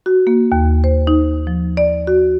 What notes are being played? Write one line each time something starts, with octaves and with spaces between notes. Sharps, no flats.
F#4
A#3
D#2
C5
D#4
F3
D5
F#4